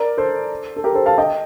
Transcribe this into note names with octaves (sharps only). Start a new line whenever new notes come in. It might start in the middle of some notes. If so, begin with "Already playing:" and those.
Already playing: A#4 D5
A4 C5
A4
G4 A#4
A4 C5
F5 A5
D#5 G5